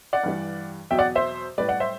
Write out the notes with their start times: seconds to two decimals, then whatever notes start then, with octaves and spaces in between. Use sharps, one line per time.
0.13 D5 F#5
0.23 G2 E3 G3
0.90 E2 B2 F#3 E5 G5
0.99 D5 F#5
1.15 C5 E5
1.58 A2 G3 B4 D5
1.68 D5 F#5
1.80 C5 E5